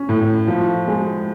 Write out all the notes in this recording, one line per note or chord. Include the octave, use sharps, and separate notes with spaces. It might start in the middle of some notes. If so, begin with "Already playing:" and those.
Already playing: C#4
A2
F3
G#3